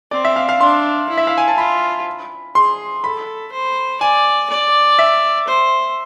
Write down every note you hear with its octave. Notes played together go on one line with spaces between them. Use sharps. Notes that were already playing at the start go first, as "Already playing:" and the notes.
C4 D5
E5
F5
F5
D4 C6
E4
E5
F5
G#5
A5
F4 B5
G#4 C6
A4 B5
C5
D5 G#5
D5
E5
C5